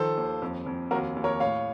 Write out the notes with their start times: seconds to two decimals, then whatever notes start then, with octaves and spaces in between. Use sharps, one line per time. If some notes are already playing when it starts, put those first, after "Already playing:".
Already playing: D#3 F3 A4 C5
0.17 D#2
0.42 F2
0.66 F2
0.91 D#2 F#4 A#4
1.16 D#2
1.24 A#4 C#5
1.40 A2 C#5 F5